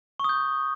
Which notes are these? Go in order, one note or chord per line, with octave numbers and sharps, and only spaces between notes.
C#6 D#6 G6